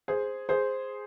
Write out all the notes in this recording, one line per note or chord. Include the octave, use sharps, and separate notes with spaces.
G#4 C5
G#4 C5